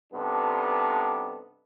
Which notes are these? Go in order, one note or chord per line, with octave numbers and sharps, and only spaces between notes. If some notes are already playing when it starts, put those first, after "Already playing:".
G2 C3 B3 D4 D#4 A4